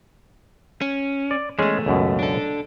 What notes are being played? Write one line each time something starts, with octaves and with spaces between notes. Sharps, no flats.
C#4
D5
E2 G#3 A3 C#4 G#4
C#2 F#2 B2
D4 A4